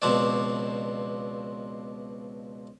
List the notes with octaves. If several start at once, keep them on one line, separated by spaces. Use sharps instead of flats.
C#2 B2 F3 C4 D4 D5